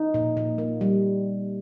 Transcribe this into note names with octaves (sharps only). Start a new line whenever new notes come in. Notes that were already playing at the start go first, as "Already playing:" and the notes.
Already playing: D#4
A#2
A#2
A#3
G3